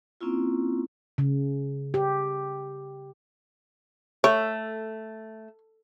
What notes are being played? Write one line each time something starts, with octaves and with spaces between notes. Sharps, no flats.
A#3 C4 C#4 E4 F4
C#3
G4
A3 C#5